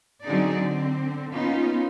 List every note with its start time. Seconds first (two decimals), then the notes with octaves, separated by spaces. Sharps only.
0.24 D3 F#3 C4 D#4 G#4 D5
0.54 D3 C4
1.31 A#3 B3 C#4 D#4 F4